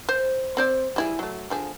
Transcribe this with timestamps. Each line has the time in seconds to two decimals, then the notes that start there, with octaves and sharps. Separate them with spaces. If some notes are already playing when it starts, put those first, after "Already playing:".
0.09 C5
0.57 C4 C5 D5
0.96 G3 E4 G#4
1.19 F#3 A3
1.50 D3 F3 G#4